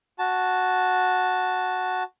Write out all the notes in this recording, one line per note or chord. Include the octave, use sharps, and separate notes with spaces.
F#4 A5